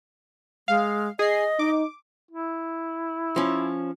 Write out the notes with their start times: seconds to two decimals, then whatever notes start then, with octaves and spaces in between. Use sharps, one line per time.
0.68 G#3 F5
1.19 G#4 D#5 C7
1.59 D#4 D6
2.31 E4
3.36 F3 C#4